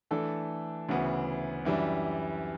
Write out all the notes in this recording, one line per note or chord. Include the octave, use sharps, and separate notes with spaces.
E3 A3 D4 A4
D2 C#3 E3 B3
F#2 E3 G3 D4